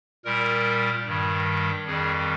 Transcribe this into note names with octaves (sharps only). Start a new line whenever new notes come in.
A#2 G3 A#4
G2 D#3 G3
F2 D#3 G3 G#4